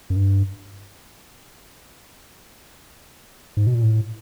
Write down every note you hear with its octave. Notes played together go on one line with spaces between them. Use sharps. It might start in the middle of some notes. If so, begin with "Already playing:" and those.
F#2
G2
G#2
B2
A#2
A2